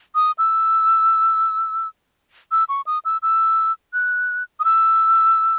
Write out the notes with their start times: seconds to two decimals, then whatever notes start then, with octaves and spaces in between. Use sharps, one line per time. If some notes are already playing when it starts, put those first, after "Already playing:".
0.15 D#6
0.38 E6
2.52 E6
2.69 C#6
2.86 D#6
3.05 E6
3.22 E6
3.93 F#6
4.60 D#6
4.65 E6